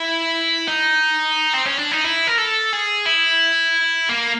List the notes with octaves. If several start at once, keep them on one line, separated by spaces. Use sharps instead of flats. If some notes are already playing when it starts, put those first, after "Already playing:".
Already playing: E4
D#4
C4
C#4
D4
D#4
E4
A#4
A4
G#4
E4
A#3